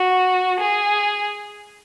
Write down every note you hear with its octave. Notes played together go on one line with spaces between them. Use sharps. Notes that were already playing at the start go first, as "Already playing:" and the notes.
Already playing: F#4
G#4